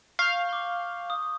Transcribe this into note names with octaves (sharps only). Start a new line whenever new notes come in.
F5 C#6 G6
D6 G7
D#6